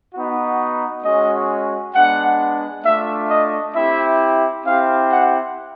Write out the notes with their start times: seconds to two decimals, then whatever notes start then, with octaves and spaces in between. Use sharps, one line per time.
0.14 B3 D#4 F#4
1.04 G#3 C#4 F#4 D#5
1.94 G#3 B3 D4 F#5
2.85 A3 D4 F4 E5
3.30 D#5
3.75 C4 E4 G4 E5
4.66 C4 E4 G4 F5
5.11 F#5